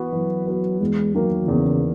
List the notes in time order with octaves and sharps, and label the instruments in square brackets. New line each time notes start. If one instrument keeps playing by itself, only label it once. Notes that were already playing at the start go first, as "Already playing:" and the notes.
Already playing: [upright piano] E3 B3 F#4 B4
[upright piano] E3 [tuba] F#3
[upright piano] B3 F#4 B4
[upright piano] E2 [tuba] G#3
[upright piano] D#3 A#3 [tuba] F#3
[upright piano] E2 [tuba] C#3